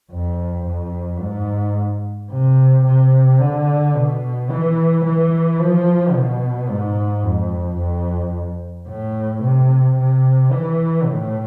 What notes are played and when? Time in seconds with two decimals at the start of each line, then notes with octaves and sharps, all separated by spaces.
0.12 F2
0.67 F2
1.22 G#2
2.31 C3
2.86 C3
3.40 D3
3.95 B2
4.50 E3
5.05 E3
5.59 F3
6.14 B2
6.69 G#2
7.23 F2
7.78 F2
8.88 A2
9.43 C3
9.97 C3
10.52 E3
11.06 A2